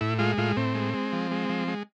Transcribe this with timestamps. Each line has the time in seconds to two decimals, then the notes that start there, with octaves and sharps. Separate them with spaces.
0.01 A2 E4
0.19 G#3 F4
0.38 A2 F4
0.57 A2 C4
0.75 G#3
0.94 G#3
1.13 F3
1.31 G#3
1.49 F3
1.68 G#3